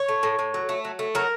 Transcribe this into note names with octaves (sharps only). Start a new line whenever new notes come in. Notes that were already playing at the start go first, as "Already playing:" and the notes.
Already playing: C#5
A3
A2
A2
F#3
A3
F#3
A3
F#3 A#4